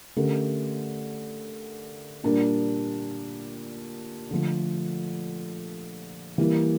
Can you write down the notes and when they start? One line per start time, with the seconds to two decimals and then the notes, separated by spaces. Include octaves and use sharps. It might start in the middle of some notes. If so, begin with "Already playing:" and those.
0.17 D3 A3 C#4 G4 A#4
2.24 A#2 G3 D4 G4 A#4
4.31 D3 F3 A3
6.38 E3 G3 A#3 E4